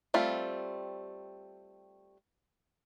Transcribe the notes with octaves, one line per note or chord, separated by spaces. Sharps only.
G3 A3 C4 F4